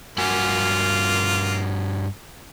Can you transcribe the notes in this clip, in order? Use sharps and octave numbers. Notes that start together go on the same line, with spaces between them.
G2 A#3 F4 F#4 G#5